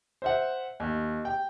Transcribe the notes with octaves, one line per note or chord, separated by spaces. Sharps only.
C5 E5 F#5
D#2
G5